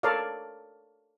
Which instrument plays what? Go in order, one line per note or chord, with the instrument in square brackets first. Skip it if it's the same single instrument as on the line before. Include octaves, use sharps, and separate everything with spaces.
[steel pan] A4 A#4 C#5 D5 F5